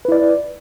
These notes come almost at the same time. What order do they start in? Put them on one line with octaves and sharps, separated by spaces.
B4 E4 D5